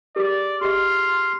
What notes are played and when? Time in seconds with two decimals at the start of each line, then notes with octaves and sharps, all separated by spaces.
0.16 G4 G#4 A#4 D5
0.61 G4 G#4 D#5 C6 F6